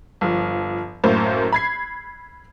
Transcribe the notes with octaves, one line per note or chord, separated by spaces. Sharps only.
G1 F3
F#2 A2 A#3 C5
B5 G#6 C7